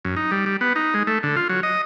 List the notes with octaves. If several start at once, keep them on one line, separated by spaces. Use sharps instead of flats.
F#2
D#4
G3
G3
B3
D#4
G#3
A3
D3
F4
F#3
D#5